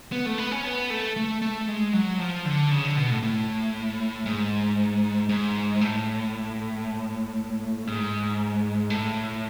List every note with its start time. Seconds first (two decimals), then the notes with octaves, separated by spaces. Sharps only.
0.12 B3
0.26 A3
0.38 B3
0.52 C#4
0.65 B3
0.90 A3
1.16 A3
1.42 A3
1.68 G#3
1.93 F#3
2.19 F3
2.45 D3
2.71 C#3
2.85 D3
2.97 B2
3.10 A2
3.23 A2
4.26 G#2
5.29 G#2
5.81 A2
7.87 G#2
8.90 A2